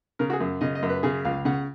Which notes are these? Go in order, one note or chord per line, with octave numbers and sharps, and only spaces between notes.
C#3 A#4
F#4
G#4
F#2
C#3 D#5
D#5
F#2
B4
C#3 G#4
C#2 F5
C#3 F#5